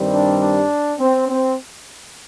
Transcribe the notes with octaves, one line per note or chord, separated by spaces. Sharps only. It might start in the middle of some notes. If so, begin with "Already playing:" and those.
Already playing: G2 D#3 G3 C4
D4
D4
C4
C4